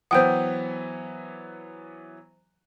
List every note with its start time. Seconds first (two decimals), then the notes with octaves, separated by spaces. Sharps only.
0.11 E3 F#3 B3 C5 F#5 G5 D#6 G6